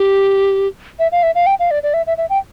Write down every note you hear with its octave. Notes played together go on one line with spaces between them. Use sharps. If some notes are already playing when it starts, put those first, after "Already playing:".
Already playing: G4
E5
F5
E5
F5
G5
F5
D5
D5
E5
E5
E5
G5